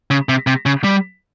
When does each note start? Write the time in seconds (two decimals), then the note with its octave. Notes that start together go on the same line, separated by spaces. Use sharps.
0.11 C#3
0.29 C3
0.47 C3
0.66 C#3
0.84 G3